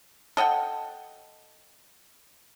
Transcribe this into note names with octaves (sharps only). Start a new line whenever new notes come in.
A4 D#5 F#5 G5